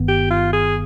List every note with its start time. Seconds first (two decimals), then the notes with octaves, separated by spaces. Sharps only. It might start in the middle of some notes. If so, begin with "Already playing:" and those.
Already playing: G1 G2 D#3 B3
0.09 G4
0.31 F4
0.53 G#4